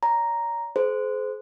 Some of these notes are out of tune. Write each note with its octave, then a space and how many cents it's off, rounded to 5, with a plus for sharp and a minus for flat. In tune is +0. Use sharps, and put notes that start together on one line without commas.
D5 -45 A#5 +0
G#4 +40 C5 -20